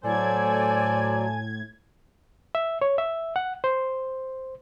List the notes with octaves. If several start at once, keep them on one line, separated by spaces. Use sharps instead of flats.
A2 F#3 A4 C5 D5 G#5 A5 G#6
E5
C#5
E5
F#5
C5